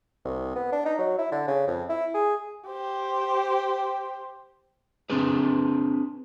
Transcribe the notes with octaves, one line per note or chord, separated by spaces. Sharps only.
C2
B3
D4
D#4
F#3
E4
D3
C#3
F2
E4
G#4
G4 C5
C4 D4 G#4 B4